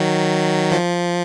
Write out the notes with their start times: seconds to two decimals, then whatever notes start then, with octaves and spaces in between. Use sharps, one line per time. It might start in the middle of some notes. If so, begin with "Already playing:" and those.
Already playing: D#3 F#3
0.72 F3